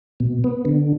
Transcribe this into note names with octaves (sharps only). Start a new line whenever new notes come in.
B2
B3
D3